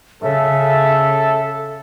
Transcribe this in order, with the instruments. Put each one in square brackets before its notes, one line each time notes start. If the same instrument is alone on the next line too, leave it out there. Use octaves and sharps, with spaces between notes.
[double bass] C#3 [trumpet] A4 [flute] E5